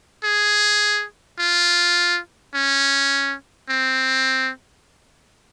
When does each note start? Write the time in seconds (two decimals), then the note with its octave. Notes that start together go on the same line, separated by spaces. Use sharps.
0.24 G#4
1.39 F4
2.54 C#4
3.70 C4